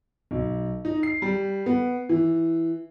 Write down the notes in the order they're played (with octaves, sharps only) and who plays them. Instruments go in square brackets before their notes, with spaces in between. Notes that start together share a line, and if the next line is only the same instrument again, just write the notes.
[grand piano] B1
D#4
C7
G3
B3
E3